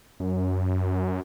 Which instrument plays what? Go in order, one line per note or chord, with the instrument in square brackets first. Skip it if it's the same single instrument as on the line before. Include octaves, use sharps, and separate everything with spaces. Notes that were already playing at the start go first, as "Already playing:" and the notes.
[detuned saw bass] F#2